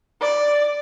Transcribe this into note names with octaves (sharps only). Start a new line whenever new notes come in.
D5